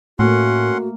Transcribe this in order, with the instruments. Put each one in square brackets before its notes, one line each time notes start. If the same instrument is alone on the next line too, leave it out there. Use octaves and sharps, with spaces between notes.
[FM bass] A2 [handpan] A3 A#3 [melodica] C#4 F#5 C6 [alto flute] F#4